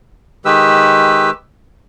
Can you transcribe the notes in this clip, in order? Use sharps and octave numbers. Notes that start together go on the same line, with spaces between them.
D#3 G#3 G4 B4 E6